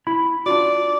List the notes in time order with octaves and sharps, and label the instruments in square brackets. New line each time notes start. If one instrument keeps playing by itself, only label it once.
[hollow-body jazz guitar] E4 B5
[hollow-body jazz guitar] D4 F4 F#4 [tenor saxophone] D5